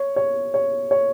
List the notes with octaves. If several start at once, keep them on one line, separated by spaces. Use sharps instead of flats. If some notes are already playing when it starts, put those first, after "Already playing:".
Already playing: C#5
C#5
C#5
C#5